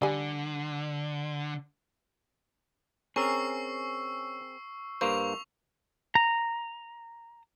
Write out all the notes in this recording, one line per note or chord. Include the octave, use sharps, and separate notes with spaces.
D3 G3 G#5
C4 C#4 G#4 A#4 C#6 E6 C7
G2 A#3 C5 C#6 F7
A#5